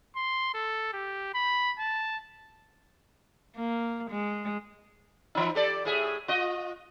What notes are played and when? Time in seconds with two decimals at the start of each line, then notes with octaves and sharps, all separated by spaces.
0.16 C6
0.54 A4
0.93 G4
1.34 B5
1.79 A5
3.56 A#3
4.11 G#3
5.35 E3 D#4
5.55 G4 A4 D5
5.85 A2 G#4 E5
6.28 F4 D#5